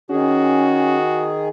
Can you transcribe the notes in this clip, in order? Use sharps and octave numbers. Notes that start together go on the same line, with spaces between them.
D#3 C#4 F#4 G#4